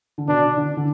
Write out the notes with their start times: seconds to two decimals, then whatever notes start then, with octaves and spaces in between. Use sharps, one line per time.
0.18 D3
0.28 B2 D4
0.57 D3
0.77 D3